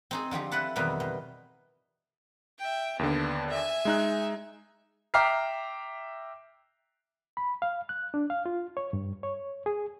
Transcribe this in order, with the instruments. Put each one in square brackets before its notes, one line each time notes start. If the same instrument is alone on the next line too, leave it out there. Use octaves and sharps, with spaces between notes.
[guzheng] C4 D#4 G#4
D3 F3 C4 G4
E4 A4 B4 F#5 A5
F2 B2 D#3 E3 G3 B3
B2
[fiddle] E5 G5
[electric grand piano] D#2 D3 [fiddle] B3 D4
[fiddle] E5 G#5
[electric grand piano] G#3 D#4 F#6
[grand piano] E5 G5 A#5 D6 F6 C7
[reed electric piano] B5
F5
F#6
D4
F5
F4
C#5
G2
C#5
G#4